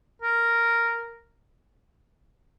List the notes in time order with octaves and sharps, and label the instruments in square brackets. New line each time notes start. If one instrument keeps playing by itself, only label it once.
[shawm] A#4